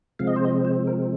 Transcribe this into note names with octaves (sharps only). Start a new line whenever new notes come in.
C3 F3 G#3 C4 F5
D#5
C5
D#5
C5
A#4